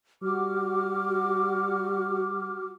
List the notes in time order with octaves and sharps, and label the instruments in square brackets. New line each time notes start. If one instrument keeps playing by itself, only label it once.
[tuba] G3 [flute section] F#4 D6 F6